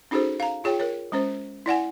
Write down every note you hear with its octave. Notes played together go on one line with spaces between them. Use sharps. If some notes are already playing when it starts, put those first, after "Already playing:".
C#4 D#4 F#4 G#4 A4 C5
F5 A#5
F4 G#4 C#5 G5
A#4 C#5
G#3 C#4 C5
E4 D5 F#5 G#5